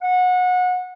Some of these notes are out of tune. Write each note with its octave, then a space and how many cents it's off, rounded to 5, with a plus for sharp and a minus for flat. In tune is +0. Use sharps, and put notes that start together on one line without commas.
F#5 -25